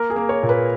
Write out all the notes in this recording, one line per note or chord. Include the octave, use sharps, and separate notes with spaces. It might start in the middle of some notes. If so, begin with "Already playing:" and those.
Already playing: A#3 A#4
G#4
A#3
C#5
A#2
B4